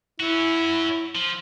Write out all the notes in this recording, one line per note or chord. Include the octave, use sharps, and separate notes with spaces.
C#4 E4 F#4
F3